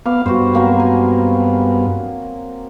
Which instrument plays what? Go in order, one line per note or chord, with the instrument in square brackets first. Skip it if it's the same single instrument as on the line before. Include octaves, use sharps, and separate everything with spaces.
[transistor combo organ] B3 F5 [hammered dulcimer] D6
[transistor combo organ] G2 B3 [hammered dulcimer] F#4 C5
[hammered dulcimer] F#3 A#3 C4
G#5